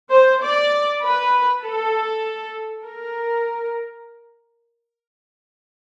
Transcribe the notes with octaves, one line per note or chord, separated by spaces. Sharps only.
C5
D5
B4
A4
A#4